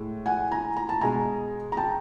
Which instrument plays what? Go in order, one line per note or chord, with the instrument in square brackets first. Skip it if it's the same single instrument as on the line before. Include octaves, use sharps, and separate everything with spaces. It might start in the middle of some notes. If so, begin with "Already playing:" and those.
Already playing: [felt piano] A2 G#3
F#5 G#5
G#5 A#5
A#5
A5
B2 G#3 G#5 A#5
A#5
G5 A5